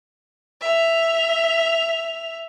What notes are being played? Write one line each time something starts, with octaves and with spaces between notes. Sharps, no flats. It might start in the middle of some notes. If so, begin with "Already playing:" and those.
E5 F7